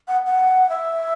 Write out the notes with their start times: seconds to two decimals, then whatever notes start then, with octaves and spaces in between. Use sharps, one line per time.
0.08 F#5
0.26 F#5
0.69 E5